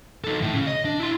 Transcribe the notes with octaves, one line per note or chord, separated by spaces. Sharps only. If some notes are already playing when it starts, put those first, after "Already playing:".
D#4 A4
A2
C#3 C#4
D#5
D4
E4 C6